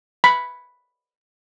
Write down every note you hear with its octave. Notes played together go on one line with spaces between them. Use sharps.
B5